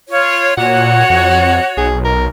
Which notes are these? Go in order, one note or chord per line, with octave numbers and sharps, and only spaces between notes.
F4 C#5
A#2 F#4 C#5 F#5
F2
B1 G#4
A#4